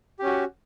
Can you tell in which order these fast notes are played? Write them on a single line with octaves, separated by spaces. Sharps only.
G4 C#4 F#4